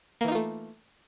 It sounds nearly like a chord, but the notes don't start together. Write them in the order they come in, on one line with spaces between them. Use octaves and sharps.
A#3 E3 D#4 F4 A3